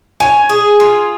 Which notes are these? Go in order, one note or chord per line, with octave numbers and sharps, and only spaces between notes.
C#5 G#5
G#4
F4